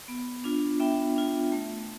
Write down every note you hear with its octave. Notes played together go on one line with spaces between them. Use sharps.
B3
D4 F4
B3 E5 G5
D4 F4
A3